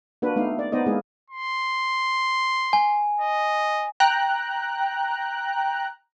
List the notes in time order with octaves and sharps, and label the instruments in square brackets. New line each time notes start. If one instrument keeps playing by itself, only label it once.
[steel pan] A#3 D4 F#4 B4
A3 B3 D#4 F5
D5
B3 D#4 C5 D5 D#5
G#3 A#3 D#4 E4 G#4
[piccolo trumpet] C6
[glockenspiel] G#5
[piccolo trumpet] D#5
[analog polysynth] G5 A#5 F#6